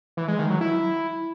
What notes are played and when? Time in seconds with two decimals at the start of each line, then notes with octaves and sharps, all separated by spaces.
0.17 E3
0.28 G#3
0.39 D#3
0.50 F#3
0.61 E4